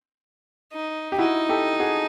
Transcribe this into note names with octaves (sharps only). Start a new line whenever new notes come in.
D#4
G4
D#4 E4 F#4
G4 A4
F#4 G#4